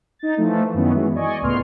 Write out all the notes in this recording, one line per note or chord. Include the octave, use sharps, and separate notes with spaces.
D#4 A6
E3 F3 A3
F#2 D#3 E3 B3 C#4
E3 F#3 G#3
D5 D#5 G#5 C#6
C#2 A2 B3 C6 F6